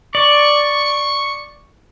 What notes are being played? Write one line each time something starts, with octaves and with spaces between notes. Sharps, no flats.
D5 C#6